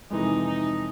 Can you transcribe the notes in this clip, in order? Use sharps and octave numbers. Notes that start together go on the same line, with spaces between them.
F2 C3 E3 G#3 D#4
D#4